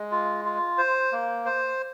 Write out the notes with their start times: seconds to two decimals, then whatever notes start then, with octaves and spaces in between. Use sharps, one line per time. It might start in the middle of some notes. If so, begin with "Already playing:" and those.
Already playing: G#3
0.11 F4
0.45 F4
0.78 C5
1.12 A#3
1.45 C5